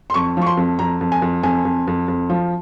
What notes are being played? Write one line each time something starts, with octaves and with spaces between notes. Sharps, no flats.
C6
F2 C#6
F3 C#6
C6
F2
F2 A#5
F2
G#5
F2
F2 G#5
F2
F2
F2
F3